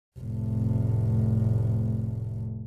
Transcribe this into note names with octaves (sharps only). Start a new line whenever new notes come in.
F1 A2